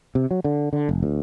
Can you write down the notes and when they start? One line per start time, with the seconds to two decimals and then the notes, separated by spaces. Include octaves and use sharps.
0.15 C3
0.31 F#3
0.44 D3
0.73 D3
0.89 F1
1.03 D2